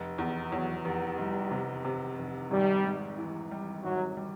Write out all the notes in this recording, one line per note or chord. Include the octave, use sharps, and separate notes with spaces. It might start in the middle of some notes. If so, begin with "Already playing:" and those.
Already playing: F1
E2
E2 F#3
F1
F1 G3
C3
C3
F1
G#1 G3
G#2
E3
G3
G#1 F#3
G3